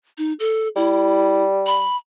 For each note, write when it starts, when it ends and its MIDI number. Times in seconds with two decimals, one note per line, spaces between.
0.18 0.33 63
0.40 0.68 69
0.76 1.84 55
0.76 1.44 64
1.67 1.97 83